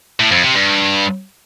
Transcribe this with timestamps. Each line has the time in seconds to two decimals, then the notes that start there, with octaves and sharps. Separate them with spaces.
0.20 A2
0.31 F2
0.43 C3
0.55 G2